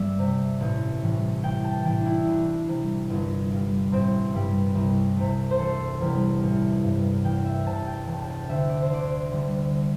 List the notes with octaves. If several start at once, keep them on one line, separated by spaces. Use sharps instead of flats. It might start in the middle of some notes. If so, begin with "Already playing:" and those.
Already playing: G2 G3 D5 E5
C3 A3
A1
A2 E3 G3
A1 G5
A5
A2 E3 G5
D4
E4
C2 D4
C3 G3
G1
G2 G3
A1 C4
G2 G3
C2
C3 A3
C5
E1 A4
E2 C3 G3
A1
G2 G3
E2 G5
E5
C3 A3 A5
G5
E1 A5
A5
G5
D2 D3 E5
D5
C5
D2 D5
D3 G3